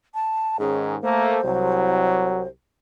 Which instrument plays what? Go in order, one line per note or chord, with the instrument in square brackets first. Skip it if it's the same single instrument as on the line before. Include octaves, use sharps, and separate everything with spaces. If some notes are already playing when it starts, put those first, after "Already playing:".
[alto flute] A5
[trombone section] G#2 D#3 C#4 [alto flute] G#4
[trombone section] A3 A#3 [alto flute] C5
[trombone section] C2 [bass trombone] F#3